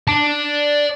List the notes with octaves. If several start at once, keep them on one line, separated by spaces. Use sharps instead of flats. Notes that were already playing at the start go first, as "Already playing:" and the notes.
D5 A5